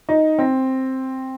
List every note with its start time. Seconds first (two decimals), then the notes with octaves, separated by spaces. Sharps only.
0.09 D#4
0.39 C4